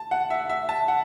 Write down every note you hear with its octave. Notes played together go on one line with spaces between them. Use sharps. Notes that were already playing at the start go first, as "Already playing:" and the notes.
Already playing: A5
F#5
E5
E5
A5
F#5